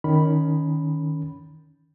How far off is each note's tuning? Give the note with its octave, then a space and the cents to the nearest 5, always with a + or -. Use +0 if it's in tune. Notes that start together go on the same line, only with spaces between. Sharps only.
D#3 +0 C#4 +15 B5 +0